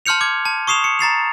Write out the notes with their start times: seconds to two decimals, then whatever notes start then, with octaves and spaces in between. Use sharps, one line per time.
0.06 A5 C6 F6 G6 C#7 F7
0.21 D6 G#6
0.45 A5
0.67 C#6 D#6 C7 E7 F7
0.84 C#7
0.99 A#5 A6 C7 F7